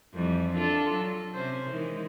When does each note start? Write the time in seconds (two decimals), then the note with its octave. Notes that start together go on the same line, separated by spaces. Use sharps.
0.14 F2 E3 G3
0.55 D4 F4 A4
0.93 F#3
1.34 C3 C#4 C5
1.70 D#3 E3 G#3